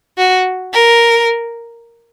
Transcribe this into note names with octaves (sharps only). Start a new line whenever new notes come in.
F#4
A#4